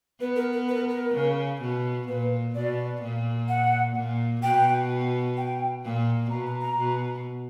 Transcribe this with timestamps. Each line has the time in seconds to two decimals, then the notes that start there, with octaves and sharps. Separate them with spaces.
0.21 B3 B4
0.36 A#4
0.53 A#4
0.68 B4
0.75 A#4
0.89 A#4
1.14 C#3
1.62 B2
2.08 A#2 B4
2.55 B2 D5
3.02 A#2
3.48 F#5
3.95 A#2
4.43 B2 G5
5.37 G5
5.84 A#2
6.30 B2 A#5
6.46 A#5
6.61 A#5
6.78 B2